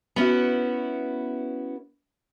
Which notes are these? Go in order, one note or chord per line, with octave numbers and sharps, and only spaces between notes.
B3 C#4 E4 F#4